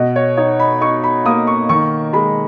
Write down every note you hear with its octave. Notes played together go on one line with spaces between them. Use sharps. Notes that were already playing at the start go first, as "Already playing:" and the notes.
Already playing: B2 D#5
C#5
D#4 C#5
B5
D#4 C#6
B5
A#3 D#6
C#6
D#3 C#6
G#3 B5